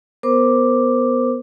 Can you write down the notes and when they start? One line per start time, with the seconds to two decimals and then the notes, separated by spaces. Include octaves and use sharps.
0.23 B3 A#4 C5 D6